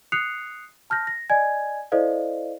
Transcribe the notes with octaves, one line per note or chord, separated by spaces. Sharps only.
D#6 F#6 C7 C#7 F7
A5 F6 G6 A#6
A#6
D5 D#5 G#5 G#6
E4 A4 C5 D5 D#5 F5